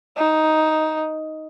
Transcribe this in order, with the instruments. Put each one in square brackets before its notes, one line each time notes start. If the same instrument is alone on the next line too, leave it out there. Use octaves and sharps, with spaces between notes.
[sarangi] D#4